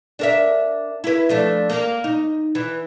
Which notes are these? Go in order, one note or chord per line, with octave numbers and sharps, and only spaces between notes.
D4 A#4 E5
E4 B4
F3 A3 D4
A#3
D#4
E3